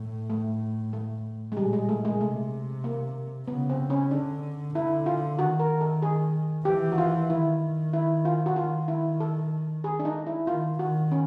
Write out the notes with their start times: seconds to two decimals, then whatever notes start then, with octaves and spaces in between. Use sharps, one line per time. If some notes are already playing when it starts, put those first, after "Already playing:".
Already playing: A2
0.30 A3
0.93 A3
1.52 G#3
1.56 A#2 G3
1.73 G#3
1.89 A3
2.05 G#3
2.21 C3 A3
2.84 A#3
3.48 C#3 B3
3.69 C4
3.90 C#4
4.11 D3 D4
4.75 D3 E4
5.06 F4
5.39 D#3 F#4
5.60 A#4
5.81 A4
6.02 G#4
6.65 E3 G4
6.92 F#4
6.98 F4
7.30 D#3 E4
7.93 E4
8.25 F4
8.46 F#4
8.56 D#3 F4
8.88 E4
9.20 A4
9.84 G#4
9.99 D4
10.05 D#4
10.27 E4
10.47 D#3 F4
10.79 D#3 F#4
11.12 C#4